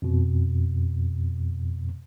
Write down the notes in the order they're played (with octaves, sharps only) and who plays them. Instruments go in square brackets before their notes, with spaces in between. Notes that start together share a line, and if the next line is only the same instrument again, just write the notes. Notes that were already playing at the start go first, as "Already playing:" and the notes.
[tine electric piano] F2 B2